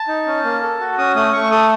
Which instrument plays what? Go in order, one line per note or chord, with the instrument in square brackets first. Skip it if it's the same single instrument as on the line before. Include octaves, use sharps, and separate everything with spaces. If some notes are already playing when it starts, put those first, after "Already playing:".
Already playing: [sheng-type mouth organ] A5
D#4
C#4
A#3
A4
F#4
C#4 D#6
A3 D#6
A3 C#6
A4 D#6